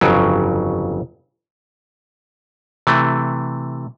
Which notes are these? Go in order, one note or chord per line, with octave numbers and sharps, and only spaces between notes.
G1 F2 C#3 F#3
C3 E3 A3